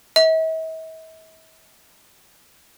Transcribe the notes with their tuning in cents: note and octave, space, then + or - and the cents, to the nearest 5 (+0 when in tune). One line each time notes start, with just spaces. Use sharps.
E5 -45